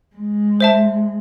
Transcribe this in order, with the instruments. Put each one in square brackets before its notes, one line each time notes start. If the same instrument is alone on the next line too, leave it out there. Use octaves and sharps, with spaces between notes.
[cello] G#3
[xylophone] C5 E5 A5